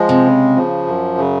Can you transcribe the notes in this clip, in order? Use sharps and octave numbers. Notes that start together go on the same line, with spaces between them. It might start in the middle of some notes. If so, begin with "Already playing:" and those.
Already playing: F3 G#3
C3
C#3
F3
F#2
C#3